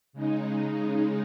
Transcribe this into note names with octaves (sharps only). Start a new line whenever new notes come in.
C#3 G#3 D#4